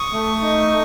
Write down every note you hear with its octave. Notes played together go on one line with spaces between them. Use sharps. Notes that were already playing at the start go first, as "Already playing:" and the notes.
Already playing: C#6 D#6
A3
D#4